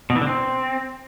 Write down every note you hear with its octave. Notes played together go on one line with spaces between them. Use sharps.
B2
E3
D3
C4